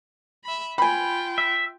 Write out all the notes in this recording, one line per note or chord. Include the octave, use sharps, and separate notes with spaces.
E5 B5
C4 F4 G5 G#5 B5
E5